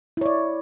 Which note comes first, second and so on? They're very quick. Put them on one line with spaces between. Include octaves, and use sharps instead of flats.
E4 C#5 D5